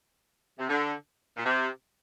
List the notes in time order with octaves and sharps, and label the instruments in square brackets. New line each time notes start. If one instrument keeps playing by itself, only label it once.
[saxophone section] C3
D3
A#2
C3